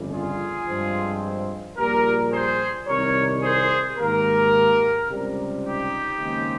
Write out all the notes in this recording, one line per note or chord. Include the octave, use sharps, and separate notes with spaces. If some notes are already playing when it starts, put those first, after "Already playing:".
Already playing: G1 F2 C#3 G3
F4 G#4
G2 F3 G#3 C4
A#1 A#2 G3 G4 A#4
G#4 C5
C2 C3 D#3 G3 A#4 C#5
G#4 C5
G#2 D#3 A#3 G4 A#4
C#2 C3 G3
D#4 G4
D#2 C#3 G#3 C4